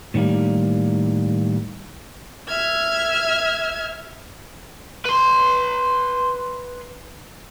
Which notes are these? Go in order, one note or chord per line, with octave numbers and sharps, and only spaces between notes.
A2 D#3 F3 G3 A#3
E5 F6 G#6
B4 C6